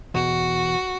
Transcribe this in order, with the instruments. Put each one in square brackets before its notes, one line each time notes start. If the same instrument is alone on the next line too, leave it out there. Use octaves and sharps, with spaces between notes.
[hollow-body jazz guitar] E2 B2 [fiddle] F#4